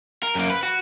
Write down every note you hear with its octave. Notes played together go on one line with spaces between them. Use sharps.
A#4
F#2 A#3
B4
F#4